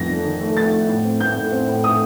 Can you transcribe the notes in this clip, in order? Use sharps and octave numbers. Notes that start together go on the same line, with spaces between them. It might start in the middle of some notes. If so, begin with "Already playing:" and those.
Already playing: F2 A3 A#6
F1
D#3
A3
A3 A6
A3
A2
C4
A2 G6
A2
C4
A2
A3 D#6